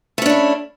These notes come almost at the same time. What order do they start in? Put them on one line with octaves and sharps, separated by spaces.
A3 C#4 D4 E4